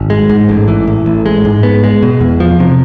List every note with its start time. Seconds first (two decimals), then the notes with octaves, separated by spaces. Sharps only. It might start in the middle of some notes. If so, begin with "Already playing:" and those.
Already playing: G#1
0.10 G#3
0.29 G#2
0.49 A1
0.68 E3
0.87 A2
1.06 A1
1.26 G#3
1.45 G#2
1.63 B3
1.83 G#3
2.03 B2
2.20 E2
2.40 F3
2.60 C3